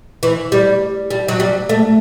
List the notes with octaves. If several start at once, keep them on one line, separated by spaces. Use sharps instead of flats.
E3
G3
G3
F#3
G3
A3